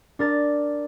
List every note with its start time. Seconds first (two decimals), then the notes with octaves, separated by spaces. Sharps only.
0.19 D4 A#4 A6